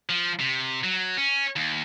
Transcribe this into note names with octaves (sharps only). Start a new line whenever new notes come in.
F3
C3
F#3
C#4
D#2